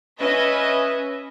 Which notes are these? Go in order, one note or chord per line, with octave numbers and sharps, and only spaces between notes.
C#4 B4 D#5 E5